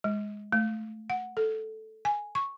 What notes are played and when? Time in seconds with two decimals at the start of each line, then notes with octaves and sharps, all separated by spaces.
0.04 G#3
0.52 A3
1.10 F#5
1.37 A4
2.05 G#5
2.35 C#6